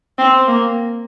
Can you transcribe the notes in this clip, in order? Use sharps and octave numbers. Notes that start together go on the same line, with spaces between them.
C4
A#3